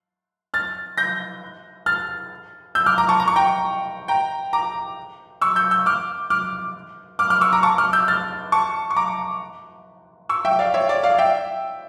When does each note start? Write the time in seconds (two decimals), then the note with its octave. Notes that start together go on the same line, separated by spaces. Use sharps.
0.54 F6 A6
0.98 G6 A#6
1.86 F6 A6
2.75 E6 G6
2.86 D6 F6
2.98 A#5 D6
3.09 A5 C#6
3.20 A#5
3.28 C#6
3.36 G5 A#5
4.08 G5 A#5
4.53 A#5 D6
5.41 C#6 E6
5.56 E6 G6
5.71 E6 G6
5.86 D6 F6
6.30 D6 F6
7.19 D6 F6
7.30 D6 F6
7.41 C#6 E6
7.53 A#5 D6
7.63 A5 C#6
7.78 D6 F6
7.93 E6 G6
8.08 F6 A6
8.52 A5 C#6
8.91 C#6
8.96 A#5 D6
10.29 C#6 E6
10.45 E5 G5
10.59 D5 F5
10.74 C#5 E5
10.89 D5
11.03 D5 F5
11.18 E5 G5